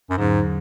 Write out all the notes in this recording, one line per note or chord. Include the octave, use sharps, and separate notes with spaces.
F#2
E2 G#2 D3 F#3 C#4 G#4